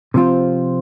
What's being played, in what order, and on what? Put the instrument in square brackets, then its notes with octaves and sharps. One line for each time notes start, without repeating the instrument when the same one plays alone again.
[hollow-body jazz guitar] C3 F3 C4 F4